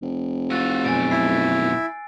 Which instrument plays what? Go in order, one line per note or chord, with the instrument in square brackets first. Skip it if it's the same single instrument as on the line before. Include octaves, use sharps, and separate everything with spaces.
[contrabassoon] F1
[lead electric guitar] F4 F#4 [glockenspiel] E6 F#6 A6
[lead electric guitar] F#2 B2 [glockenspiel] G#5 A6 D7
[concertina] E4 [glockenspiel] C7